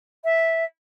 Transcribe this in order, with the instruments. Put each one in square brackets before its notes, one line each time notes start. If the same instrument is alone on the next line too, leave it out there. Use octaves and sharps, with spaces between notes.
[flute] E5